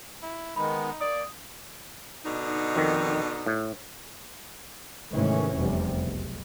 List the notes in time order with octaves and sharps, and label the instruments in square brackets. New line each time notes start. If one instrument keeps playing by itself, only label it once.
[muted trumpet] E4
[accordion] D#3 G#3 B3 [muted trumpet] D#4 [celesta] B5
[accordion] A#3 [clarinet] D5 [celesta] D#6
[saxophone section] B2 D3 D#4
[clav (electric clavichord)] F2 D#3
A2
[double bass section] G#2 C3 D#3 E3 A3 C#4
F1 E2 C3 G3
B1